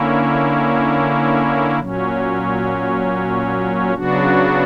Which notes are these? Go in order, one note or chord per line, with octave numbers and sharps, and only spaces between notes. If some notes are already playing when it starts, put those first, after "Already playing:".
Already playing: D3 A#3 C#4 E4
A#2 F#3 C#4
C#3 F#3 B3 D4 F#4